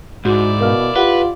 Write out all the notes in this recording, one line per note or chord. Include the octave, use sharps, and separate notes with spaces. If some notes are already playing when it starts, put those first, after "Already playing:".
G#2 E4 F#4 D5
B2 A#4 F5 F6
F4 G4 B4 F#5 G7